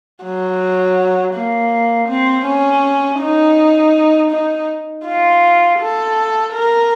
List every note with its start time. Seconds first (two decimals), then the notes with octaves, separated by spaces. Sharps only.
0.24 F#3
1.35 A#3
2.09 C4
2.46 C#4
3.20 D#4
4.31 D#4
5.05 F4
5.79 A4
6.53 A#4